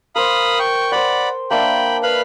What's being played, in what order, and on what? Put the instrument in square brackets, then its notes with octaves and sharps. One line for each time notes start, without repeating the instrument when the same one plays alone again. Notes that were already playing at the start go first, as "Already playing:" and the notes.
[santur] A#4 C5 [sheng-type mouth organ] F5 B5 D#6
[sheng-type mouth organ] G5 C#6
[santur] C5 G5 [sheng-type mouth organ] D5 F#5 B5
[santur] A#3 D4 E5 [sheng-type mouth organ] G5 B5
[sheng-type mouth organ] B4 F5 B5